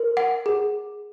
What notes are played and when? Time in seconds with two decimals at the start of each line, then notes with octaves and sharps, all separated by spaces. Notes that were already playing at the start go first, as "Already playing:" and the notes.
Already playing: A#4
0.17 F#5
0.46 G#4